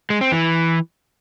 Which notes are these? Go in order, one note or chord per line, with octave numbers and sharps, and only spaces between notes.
G#3
C4
E3